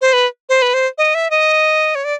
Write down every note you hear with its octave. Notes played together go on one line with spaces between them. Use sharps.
C5
B4
C5
B4
C5
D#5
E5
D#5
C#5
D5